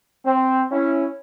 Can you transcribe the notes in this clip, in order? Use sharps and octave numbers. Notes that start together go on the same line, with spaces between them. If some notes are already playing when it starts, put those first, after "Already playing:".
C4
C#4 E4